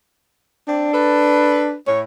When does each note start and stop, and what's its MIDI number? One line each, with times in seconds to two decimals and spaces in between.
0.68 0.91 60
0.68 1.75 62
0.68 0.91 74
0.94 1.74 69
0.94 1.74 71
1.87 2.04 45
1.87 2.01 73